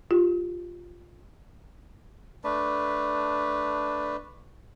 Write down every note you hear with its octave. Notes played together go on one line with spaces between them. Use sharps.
F4 G4
A3 D4 B4